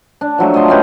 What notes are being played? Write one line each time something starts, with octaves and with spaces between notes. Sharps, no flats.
D4
F3 F#3 A3
D#5 A5 A#5 C6
A3 C#4 G4 B4